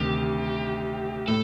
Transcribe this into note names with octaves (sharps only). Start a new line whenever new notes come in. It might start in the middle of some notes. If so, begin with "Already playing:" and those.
Already playing: D2 C3 D#3 G4
A2 A4